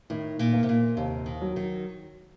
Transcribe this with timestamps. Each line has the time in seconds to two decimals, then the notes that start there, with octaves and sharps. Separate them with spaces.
0.10 A2 D#3
0.39 A#2
0.54 A#3
0.63 C3
0.69 A#2
0.97 D#2 C3
1.26 D#3
1.41 F#3
1.56 D#3